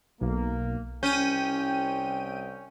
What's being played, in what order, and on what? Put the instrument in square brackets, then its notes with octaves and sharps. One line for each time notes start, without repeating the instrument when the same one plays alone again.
[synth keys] B1 [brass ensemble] A#3
[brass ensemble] C2 G5 [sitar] C#4 [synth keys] G6 D#7